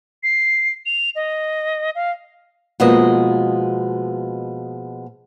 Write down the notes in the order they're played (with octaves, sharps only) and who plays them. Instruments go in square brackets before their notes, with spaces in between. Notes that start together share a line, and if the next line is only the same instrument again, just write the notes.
[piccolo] C7
F7
D#5
F5
[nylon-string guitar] B2 F3 G#3 A#3 B4 D#5